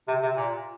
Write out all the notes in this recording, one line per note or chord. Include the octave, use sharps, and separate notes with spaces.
C3
C3
A#2